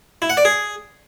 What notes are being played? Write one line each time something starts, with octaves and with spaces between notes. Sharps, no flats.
E4
F#5
D5
G#4